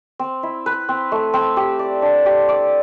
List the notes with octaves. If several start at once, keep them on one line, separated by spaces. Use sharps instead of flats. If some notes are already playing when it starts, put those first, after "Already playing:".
C4
E4
B4
C4
A3
C4
G4
D5
D4
G4
D5